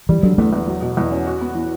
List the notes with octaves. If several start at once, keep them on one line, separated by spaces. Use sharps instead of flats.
E3 G3
D3 F#3
E2 A3
E2
F#3
B2
E2
C#4
F#4
B3
E3